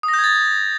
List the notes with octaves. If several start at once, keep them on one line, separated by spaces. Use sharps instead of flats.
D#6
A#6
G6
G#6
A6